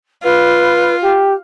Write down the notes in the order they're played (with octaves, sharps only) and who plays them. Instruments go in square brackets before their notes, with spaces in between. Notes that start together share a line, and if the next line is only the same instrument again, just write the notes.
[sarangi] F4 [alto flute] B4
[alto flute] G4